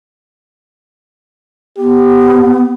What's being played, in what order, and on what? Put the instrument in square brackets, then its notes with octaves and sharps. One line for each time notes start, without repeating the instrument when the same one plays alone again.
[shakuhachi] B3 [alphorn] G4